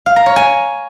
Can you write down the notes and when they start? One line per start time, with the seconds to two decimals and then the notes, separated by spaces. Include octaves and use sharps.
0.06 F5
0.16 A#5
0.26 C#5
0.36 G#5